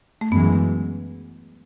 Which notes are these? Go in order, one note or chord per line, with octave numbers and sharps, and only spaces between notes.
A3
F#2 E3 G#3 B3